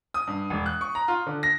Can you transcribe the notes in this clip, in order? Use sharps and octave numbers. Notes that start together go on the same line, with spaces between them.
D#6
G2
E1
F#6
C#6
A#5
F4
D3
A#6